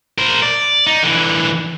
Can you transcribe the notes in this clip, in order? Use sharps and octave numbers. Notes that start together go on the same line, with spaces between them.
A#4 C5
D5
D#4
D3 E3